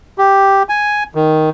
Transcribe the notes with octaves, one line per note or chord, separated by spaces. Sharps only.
G4
G#5
D#3